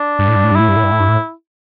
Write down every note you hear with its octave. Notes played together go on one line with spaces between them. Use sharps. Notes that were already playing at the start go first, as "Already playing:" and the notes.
Already playing: D4
G2
A2
G2
A2
G2
A2 E4
G2
A2
G2
A2
G2
A2